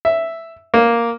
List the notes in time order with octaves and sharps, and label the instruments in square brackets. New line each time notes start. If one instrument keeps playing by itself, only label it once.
[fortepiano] E5
A#3